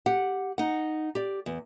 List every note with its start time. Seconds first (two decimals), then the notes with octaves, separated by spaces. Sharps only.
0.06 G4 F#5
0.58 D#4 F#5
1.15 G4 D5
1.46 E2